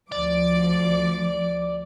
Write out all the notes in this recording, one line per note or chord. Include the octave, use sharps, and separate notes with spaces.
D2 F3 D5 D6